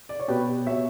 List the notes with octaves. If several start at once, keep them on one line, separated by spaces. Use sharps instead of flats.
D5
C#5
B2 G4 B4
B2 C#5 E5